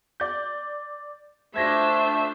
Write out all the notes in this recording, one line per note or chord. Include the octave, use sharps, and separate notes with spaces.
D5 G6
A3 D4 F4 C5 E5 G#6 A#6 B6